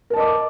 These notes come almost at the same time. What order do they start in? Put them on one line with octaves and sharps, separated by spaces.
A#4 A5 D#5 D6